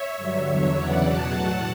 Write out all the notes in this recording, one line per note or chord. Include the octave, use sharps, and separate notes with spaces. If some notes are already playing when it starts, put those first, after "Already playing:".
Already playing: C#5 E5
G2 D3 F#3
E2 D3 F#3 C#5 E5
E2 C#3 E3 D5 F#5
E2 B2 F#3 F#5 A5
A2 F#3